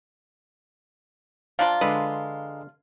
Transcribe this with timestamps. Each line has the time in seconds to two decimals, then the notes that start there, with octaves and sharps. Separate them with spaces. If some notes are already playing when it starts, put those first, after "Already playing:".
1.59 F3 D4 F4 F5 A#5
1.81 D3 G#3 B4